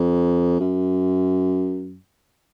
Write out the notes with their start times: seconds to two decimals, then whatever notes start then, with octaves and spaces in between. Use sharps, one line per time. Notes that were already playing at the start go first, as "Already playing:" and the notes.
Already playing: F2
0.60 F#2